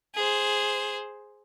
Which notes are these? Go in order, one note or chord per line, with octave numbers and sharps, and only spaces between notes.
G#4 C5